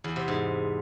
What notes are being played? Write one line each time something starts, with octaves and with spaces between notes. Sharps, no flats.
E2
C3
G#2